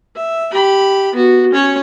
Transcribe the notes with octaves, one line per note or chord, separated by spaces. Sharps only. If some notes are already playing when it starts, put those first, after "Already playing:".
E5
G4 B5
B3 F#4
C#4 C#5